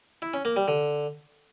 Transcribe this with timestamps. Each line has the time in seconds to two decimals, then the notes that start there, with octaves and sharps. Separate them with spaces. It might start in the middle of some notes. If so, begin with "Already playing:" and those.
0.22 E4
0.34 C#4
0.45 A#3
0.56 G3
0.68 D3